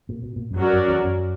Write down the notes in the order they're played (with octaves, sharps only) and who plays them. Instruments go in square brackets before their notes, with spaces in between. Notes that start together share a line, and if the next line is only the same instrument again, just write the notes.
[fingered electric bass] A#2
B2
A#2
F#2
[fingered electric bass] G2 [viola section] F#3 C#4 F#4 A#4 D5
[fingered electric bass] F#2
E2
F#2